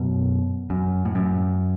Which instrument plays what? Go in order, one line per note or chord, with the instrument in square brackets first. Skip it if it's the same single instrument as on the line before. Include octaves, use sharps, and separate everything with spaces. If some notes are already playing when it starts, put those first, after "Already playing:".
Already playing: [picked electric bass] F#2 B2
F#2
A2
F#2